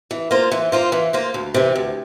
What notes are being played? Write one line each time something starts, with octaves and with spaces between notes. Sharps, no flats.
E3
A#3 F4 C5
E3
A#3 F4 C5
E3
A#3 F4 C5
D2
C3 E3
D2